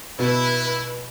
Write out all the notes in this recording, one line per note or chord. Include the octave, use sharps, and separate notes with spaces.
B2 E4 B4